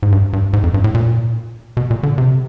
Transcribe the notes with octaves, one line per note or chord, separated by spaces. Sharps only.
G#2
G2
G2
G#2
F2
G2
A2
A#2
B2
A#2
D3
C3